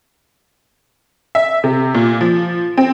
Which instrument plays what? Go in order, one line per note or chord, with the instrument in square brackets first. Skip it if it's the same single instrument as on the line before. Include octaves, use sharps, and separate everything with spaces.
[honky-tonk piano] E5
C3
A#2
F3
C4